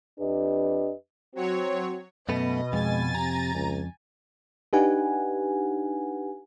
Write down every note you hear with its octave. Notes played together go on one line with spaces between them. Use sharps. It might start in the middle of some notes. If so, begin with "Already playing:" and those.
F2 D4 G4 B4 D#5
F#3 C4 F#4 C#5
F#2 B2 A3 B3 D#5
F2 G#3 G#5 A6
C3 A#5
C#2
D4 D#4 G4 B4 F#5 G#5